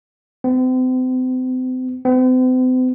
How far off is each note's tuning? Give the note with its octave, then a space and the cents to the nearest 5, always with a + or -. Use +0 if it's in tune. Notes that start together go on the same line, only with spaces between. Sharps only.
C4 -40
C4 -45